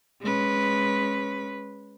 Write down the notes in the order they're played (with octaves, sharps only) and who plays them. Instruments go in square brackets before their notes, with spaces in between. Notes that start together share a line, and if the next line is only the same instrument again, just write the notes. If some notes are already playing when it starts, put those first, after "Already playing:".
[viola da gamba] G#3 C#4 B4